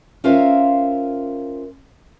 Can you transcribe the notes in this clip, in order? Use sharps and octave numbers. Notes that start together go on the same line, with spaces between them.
C#4 F4 A#4 C5 E5 F5